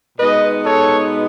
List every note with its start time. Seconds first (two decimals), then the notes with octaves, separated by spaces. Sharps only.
0.18 B2 G#3 B3 D#4 B4 D#5
0.65 A4 C#5